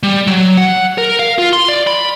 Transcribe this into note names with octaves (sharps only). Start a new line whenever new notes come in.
G3
F#3
F#5
A#4
F5
F4
C6
D5
B5